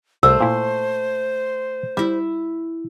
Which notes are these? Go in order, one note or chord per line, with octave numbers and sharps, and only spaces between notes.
C2 A3 C5 E6
A#2 E4
G3 E4 E5